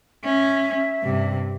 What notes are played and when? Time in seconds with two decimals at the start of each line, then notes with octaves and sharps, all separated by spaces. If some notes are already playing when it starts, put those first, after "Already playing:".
0.25 C#4 E5
1.03 G2 C3